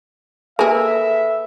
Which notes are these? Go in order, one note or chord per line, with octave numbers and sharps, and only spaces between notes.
A#3 G#4 A4 B4 E5